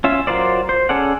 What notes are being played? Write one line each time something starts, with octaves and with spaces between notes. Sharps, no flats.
C#4 F4 E5
F#3 F4 A#4 C5 D5
C5
C#4 G#4 A4 D5 F#5